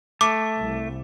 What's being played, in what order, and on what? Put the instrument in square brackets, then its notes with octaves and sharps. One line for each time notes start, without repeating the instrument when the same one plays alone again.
[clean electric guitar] A3 [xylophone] D6
[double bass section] C2